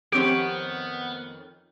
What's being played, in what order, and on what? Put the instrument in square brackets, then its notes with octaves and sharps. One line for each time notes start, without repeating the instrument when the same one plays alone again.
[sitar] F2 D#3 C#5 [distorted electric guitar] B3 [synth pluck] C4 G4 [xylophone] D7